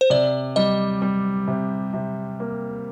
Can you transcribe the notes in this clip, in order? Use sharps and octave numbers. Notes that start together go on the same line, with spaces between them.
C5
C3 D5
G3 D#5
G3
C3
C3
A#3